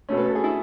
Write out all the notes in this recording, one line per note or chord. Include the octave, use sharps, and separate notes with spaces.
B2 A3 C#4
B4
A4
G#4
E4